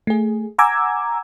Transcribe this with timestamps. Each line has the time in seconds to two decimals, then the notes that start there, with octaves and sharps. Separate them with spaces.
0.07 A3 G#4
0.58 F#5 G#5 A#5 D6 E6 G#6